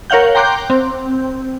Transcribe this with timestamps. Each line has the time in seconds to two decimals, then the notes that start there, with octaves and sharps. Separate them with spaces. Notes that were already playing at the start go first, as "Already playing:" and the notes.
0.10 A#4 C#5 F5 F#5 G6
0.35 G5 A#5 C6 D6 F#6 G6
0.70 C4